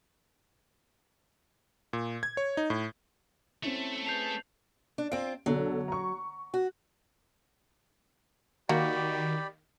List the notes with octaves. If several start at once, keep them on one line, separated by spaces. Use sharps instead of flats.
A#2
G#6
C#5
D#4
A2
A3 C4 C#4 E4 A4
G#4 B4 A5 G6 C7 F7
D4
C4 F4 D7
B1 D3 F#3
A#5 C#6
F#4
D#3 A#3 F#4 G4 D5 B5